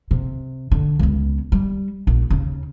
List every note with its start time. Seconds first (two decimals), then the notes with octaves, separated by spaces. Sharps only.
0.11 C3
0.72 D3
0.99 C#2 B3
1.52 G3
2.07 A#1 A#2
2.30 D#2 C#3